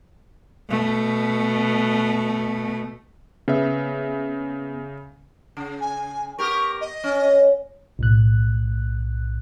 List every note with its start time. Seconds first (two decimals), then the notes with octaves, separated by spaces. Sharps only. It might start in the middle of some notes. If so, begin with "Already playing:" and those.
0.69 B2 A3
3.48 C#3 B3 E5
5.57 C#3
5.81 G#5
6.39 B3 G4 A#4 C#6
6.81 D#5
7.04 C#4
7.99 B1 A2 F#6